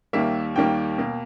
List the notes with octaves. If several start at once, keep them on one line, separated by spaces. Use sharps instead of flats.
D#2 D#3 G3 A#3 E5
D#2 D#3 G3 A#3 G5
B2 A#3